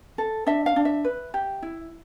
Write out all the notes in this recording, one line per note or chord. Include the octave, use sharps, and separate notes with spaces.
A4
D4 E5
F5
D4
E5
B4
G4
E4